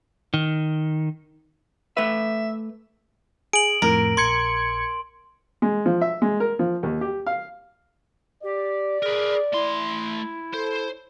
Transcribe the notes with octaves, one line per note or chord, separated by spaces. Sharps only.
D#3
A3 B4 E5
G#4 D7 F#7
F2 A2 A#4
A#1 C6 G#6 C#7
G#3
F3
E5
G#3
A#4
F3
D#2
G4
F5
G4 D5
G#4 A#4 B4
A3 E4 C6
A4 C5